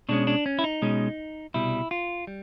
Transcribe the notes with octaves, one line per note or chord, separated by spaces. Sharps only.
B2 G#3 C#4 D4
D4
C#4
E4
D#4
B2 G#3 C#4
C2 B2 G3 E4
F4
G3